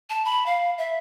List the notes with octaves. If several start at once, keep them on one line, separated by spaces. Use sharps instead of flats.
A5
B5
F5
E5